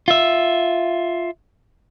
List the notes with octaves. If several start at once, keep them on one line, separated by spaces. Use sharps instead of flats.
F4 E5